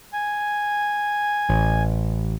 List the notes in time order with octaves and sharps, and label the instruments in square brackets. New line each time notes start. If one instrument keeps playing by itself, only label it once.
[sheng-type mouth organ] G#5
[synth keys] A1